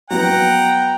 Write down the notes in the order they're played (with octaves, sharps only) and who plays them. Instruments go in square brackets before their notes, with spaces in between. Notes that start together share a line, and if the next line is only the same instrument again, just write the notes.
[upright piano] F#3 B3 [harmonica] F#5 A#5 [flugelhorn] G5